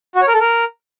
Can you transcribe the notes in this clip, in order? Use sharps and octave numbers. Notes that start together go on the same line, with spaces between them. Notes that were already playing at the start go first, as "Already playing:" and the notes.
F#4
C#5
A#4
A4
A#4